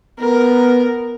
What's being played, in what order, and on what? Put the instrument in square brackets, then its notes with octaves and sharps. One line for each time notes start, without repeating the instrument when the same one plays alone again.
[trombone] B3 [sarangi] A#4